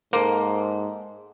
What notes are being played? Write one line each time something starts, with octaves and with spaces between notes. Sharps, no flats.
G#2 A#3 A4 C5